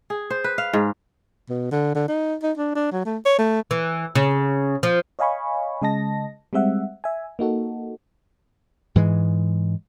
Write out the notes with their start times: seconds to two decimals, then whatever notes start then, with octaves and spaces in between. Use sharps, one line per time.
0.10 G#4
0.30 C5
0.44 B4
0.58 F5
0.73 G#2
1.49 B2
1.72 D3
1.95 D3
2.08 D#4
2.43 D#4
2.58 D4
2.75 D4
2.92 F#3
3.06 A3
3.25 C#5
3.39 A3
3.71 E3
4.15 C#3
4.83 F3
5.19 C#5 D#5 F5 G#5 B5 C#6
5.82 C#3 G#3 D#5 A5 A#6
6.53 G3 G#3 C4 E5 F#5
7.04 E5 G#5
7.39 A#3 D#4 F#4 A4
8.95 G#2 E3 G#3